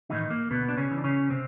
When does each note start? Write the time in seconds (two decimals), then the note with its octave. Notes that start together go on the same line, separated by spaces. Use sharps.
0.10 A2 D#3 E3 D#4
0.30 A#3
0.50 D2 B2 B3
0.69 D4
0.77 C#3 C#4
0.91 C#3 E3
0.98 D4
1.04 C#3 C#4
1.30 C3 C4